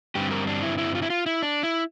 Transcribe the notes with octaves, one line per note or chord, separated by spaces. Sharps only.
G2 D3 G3 C4 G4
A#4
D4
E4
E4
F4
E4
F4
E4
D4
E4